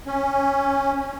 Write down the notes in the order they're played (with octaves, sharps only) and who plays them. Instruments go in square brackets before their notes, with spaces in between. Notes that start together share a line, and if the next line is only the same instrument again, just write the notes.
[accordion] C#4